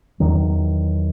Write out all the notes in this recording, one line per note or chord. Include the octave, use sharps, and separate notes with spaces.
E2 D#3 F#3